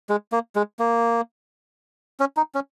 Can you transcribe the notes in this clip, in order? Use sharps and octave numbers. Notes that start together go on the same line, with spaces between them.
G#3
A#3
G#3
A#3
C#4
D#4
C#4